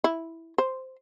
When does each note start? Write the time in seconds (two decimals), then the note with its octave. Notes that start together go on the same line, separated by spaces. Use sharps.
0.04 E4
0.58 C5